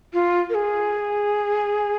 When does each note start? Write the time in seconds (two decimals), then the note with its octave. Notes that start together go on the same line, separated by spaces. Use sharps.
0.14 F4
0.50 A#4
0.55 G#4